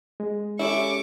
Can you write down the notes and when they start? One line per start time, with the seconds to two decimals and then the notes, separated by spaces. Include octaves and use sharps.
0.20 G#3
0.59 C#4 E4 G4 A4 C#6 D6